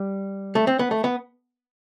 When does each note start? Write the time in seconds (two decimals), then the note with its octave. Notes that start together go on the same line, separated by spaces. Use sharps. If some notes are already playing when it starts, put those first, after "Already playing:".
Already playing: G3
0.55 A3
0.67 C4
0.79 B3
0.91 A3
1.04 B3